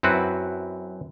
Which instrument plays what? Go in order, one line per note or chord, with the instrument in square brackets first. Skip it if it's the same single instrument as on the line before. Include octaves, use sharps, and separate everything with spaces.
[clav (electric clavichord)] F#2 C4 E4 F#4 B4